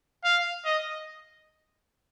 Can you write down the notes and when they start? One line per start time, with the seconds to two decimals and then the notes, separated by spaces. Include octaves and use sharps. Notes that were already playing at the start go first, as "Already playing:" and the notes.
0.24 F5
0.65 D#5